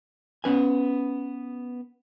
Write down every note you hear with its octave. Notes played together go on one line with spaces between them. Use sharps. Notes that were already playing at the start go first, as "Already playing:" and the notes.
B3 C#4 B4 G#5